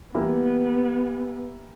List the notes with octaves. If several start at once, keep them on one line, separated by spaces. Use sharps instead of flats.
E3 G3 A#3 B3 E4 G4